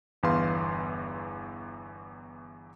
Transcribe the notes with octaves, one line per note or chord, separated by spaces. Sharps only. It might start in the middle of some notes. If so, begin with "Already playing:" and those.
G1 E2 E3 B4 F5 C6